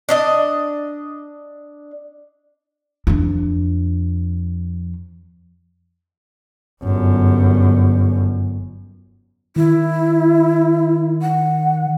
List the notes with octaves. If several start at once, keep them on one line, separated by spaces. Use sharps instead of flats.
D4 D5 D#5
F2 D4
G1 F#2
D#3 E4
F#5